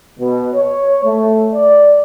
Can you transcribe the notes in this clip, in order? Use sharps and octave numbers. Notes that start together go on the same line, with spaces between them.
B2
C#5
A3
D5